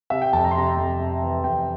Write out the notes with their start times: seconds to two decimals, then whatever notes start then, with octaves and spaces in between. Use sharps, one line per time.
0.10 C3 E5
0.22 G5
0.33 F2 A5
0.44 A#5
0.51 C6
0.55 C3 A#5
0.77 F2
1.00 C3
1.22 E3
1.44 F2 G5